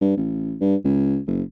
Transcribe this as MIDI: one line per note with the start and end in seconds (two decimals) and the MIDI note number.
0.01 0.17 43
0.17 0.55 33
0.61 0.75 43
0.84 1.19 37
1.27 1.42 30